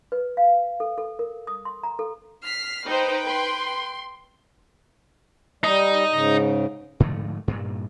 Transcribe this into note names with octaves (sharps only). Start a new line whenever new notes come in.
B4
F5
A4
A4
A#4
D#6
C6
A#5
A4
F6 B6 C7
D#4 B4 C5 G5
C6
G3 D#4
G#2 C#3
G#2 D3 F3 A3
G2 A#2